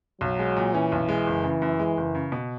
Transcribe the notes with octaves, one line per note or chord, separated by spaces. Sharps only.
B1 F#3
G#3
A#2
E3 C#4
B1
G#3
F#1
C#3
F#2
G#3
F#1
C#3
B2